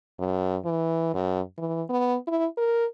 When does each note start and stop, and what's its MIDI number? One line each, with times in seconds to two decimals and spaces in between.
0.20 0.57 42
0.65 1.13 52
1.14 1.41 42
1.58 1.83 52
1.90 2.16 59
2.28 2.47 64
2.58 2.86 70